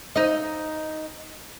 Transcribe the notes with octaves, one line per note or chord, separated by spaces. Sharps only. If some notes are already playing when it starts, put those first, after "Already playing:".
D#4 D#5